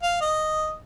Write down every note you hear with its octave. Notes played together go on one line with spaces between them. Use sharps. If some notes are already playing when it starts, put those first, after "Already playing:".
F5
D#5